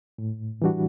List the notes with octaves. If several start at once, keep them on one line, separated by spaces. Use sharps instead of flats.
A2
E3 G3 D4 F#4